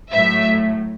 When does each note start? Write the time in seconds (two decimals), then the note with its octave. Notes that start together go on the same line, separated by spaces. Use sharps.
0.13 A2 F#3 A3 E5